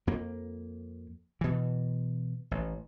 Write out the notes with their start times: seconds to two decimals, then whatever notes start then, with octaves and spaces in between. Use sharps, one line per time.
0.07 F2 A#3
1.41 B2 E3
2.51 A1